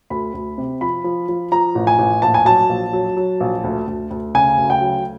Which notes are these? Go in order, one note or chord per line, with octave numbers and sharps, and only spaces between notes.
D2 B5
D2
C3
F3 B5
F3
F3
F3 A#5
A1
G#5
A1
A#1 A5
G#5
F#3 A5
A#1
F#3
F#3
A#1
D2
D2
D2
C#3 G#5
D2
G5
F#3